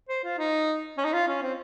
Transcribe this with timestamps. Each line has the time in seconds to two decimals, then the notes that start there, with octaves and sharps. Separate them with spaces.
0.09 C5
0.24 F4
0.38 D#4
0.98 C#4
1.05 D#4
1.13 F4
1.27 C#4
1.42 C4